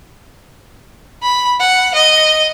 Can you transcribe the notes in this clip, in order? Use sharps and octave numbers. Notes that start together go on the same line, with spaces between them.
B5
F#5
D#5